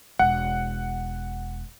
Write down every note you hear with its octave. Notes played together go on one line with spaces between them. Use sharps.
E1 F#5